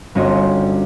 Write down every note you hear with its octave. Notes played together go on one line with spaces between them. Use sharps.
G1 C4 C#4 F#4 D#5